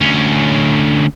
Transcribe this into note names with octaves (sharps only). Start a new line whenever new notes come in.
D2 C#4